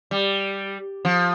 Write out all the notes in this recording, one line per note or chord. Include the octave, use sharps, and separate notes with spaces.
G3
F3